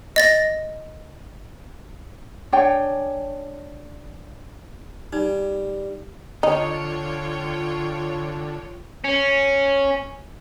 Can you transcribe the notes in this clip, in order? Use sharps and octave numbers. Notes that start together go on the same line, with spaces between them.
D#5 A6 A#6
D4 C#5 G5 G#5
G3 D#4
D3 D#4 F4 C#5 G5
C#4